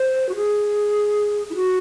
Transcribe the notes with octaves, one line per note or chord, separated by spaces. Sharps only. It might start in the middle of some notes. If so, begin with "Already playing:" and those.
Already playing: C5
F#4
G#4
E4
F#4